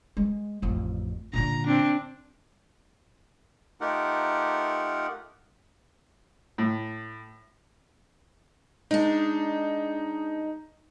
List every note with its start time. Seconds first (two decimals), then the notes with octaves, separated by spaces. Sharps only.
0.17 G#3
0.62 A1 F2
1.33 A#2 D3 A#5
1.66 C4 D4
3.81 A3 D#4 F4 G4 A#4 F#5
6.58 A2
8.91 G#3 D4 D#4